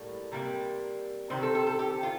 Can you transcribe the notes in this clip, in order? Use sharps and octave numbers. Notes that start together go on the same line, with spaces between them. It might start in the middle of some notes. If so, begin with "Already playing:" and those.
Already playing: A2 G3 A#3
C3 G3 A#3
C3 D#3 G3 C4 C5
A4
A4
A4
G4
F4